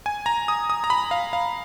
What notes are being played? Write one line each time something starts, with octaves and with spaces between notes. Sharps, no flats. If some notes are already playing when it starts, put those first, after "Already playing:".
G#5
A#5
D#6
D#6
A#5
B5
F5
F5